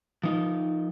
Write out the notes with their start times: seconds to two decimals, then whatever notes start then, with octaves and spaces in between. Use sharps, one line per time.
0.23 F3 D#4